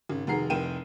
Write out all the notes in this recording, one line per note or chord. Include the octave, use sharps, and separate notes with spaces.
G#1 C#3
F1 D#3 F#4 G#4 A#5 C7
F1 C2 A#4 G5 D#7 E7